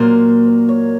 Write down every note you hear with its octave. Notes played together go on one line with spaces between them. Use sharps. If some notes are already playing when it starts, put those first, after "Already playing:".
Already playing: A#2 F#3 A#3 C5
C#5